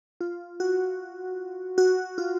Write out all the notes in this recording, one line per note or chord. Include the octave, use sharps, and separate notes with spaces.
F4
F#4
F#4
F4